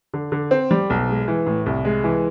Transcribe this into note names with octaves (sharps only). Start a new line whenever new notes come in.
D3
D3
C4
G3
B1
G#3
E3
A2
C2
G#3
E3